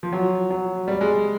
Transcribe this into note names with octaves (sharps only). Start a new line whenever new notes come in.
F3
F#3
F#3
G3
G#3